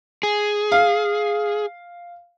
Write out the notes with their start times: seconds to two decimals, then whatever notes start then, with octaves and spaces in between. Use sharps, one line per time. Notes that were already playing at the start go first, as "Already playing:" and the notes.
0.23 G#4
0.72 F5